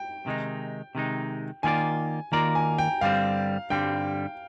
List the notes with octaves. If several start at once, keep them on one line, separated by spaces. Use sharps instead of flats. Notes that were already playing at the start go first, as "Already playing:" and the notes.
Already playing: G5
C3 D#3 G#3 D#4
C3 D#3 G#3 D#4
D#3 A#3 F4 A#4 D5 G#5
D#3 A#3 F4 A#4 D5 A#5
G#5
G5
G2 D3 G3 C4 F5
G2 D3 G3 C4 G5